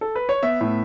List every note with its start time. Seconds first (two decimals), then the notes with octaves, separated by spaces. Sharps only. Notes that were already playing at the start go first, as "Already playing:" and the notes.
0.01 A4
0.16 B4
0.29 C#5
0.43 B3 E5
0.61 A2